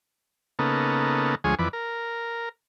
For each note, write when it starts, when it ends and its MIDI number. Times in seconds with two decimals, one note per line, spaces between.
0.59 1.35 49
0.59 1.35 58
0.59 1.35 59
0.59 1.35 63
0.59 1.35 69
1.44 1.55 38
1.44 1.55 53
1.44 1.55 56
1.44 1.55 68
1.44 1.55 73
1.44 1.55 80
1.59 1.68 41
1.59 1.68 52
1.59 1.68 71
1.59 1.68 74
1.73 2.49 70